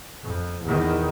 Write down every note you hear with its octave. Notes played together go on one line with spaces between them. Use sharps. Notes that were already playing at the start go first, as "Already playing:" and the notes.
F2
E2 D#3